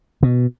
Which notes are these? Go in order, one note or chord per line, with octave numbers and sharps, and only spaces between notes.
B2